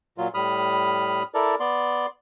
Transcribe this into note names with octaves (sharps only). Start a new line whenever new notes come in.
A#2 F#3 F4
A2 G3 B5 D#6 F6
E4 A4 A#4 D5
B3 D5 C6